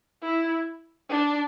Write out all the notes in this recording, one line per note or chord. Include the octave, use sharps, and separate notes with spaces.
E4
D4